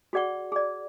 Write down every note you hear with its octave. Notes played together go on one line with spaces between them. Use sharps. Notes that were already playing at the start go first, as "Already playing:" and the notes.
F#4 G#4 D5 F#5 C#6
G#4 D5